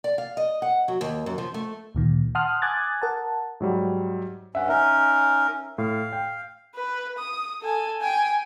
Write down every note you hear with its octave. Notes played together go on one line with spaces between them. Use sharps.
D5
F5
D#5
F#5
F#3
D#2
F#2
F3
A3
D2 A#2 D#3
F#5 A5 C6 D#6 F6 F#6
G#5 D6 D#6 F#6 G#6 A6
A#4 F#5 A5
G#2 F#3 G3
G2 C#4 E5 F#5
C#4 D#4 A#4 E5
A2 F5
G5
B4
D#6
A4 G#5
G5 G#5